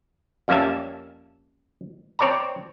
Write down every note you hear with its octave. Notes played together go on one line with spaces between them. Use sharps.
F2 G3 A#3 C#4 E5 A5
C4 C#5 D5 A5 A#5